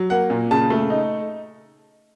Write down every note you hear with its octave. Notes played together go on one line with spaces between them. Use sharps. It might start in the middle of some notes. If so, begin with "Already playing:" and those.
Already playing: F#3
A#3 F#5
A#2
C#3 A5
A3
D#4